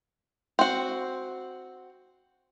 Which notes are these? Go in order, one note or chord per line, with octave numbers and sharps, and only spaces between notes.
C4 F#4